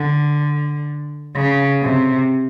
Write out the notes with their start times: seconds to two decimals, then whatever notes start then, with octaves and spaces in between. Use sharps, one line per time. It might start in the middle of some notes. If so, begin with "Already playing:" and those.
Already playing: D3
1.36 C#3
1.82 C3